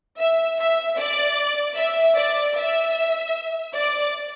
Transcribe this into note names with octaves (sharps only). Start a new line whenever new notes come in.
E5
E5
D5
E5
D5
E5
D5